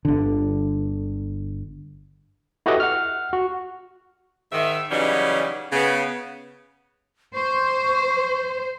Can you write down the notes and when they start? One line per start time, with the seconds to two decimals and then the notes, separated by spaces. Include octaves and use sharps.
0.05 G1 D3
2.66 E4 F#4 G4 A4 B4 D#5
2.80 F#5 F6
3.33 F#4
4.52 G#2 D#3 E5
4.90 C#3 E3 F#3 G3 C#4 D#4
5.72 C#3 B3
7.35 C5 C#6